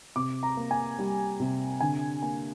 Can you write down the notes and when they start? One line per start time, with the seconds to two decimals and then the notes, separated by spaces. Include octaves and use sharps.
0.16 C3 D6
0.43 A#5
0.57 A#3
0.71 G#5
0.99 G3
1.40 C3
1.81 D3 G#5
2.22 A#3 G#5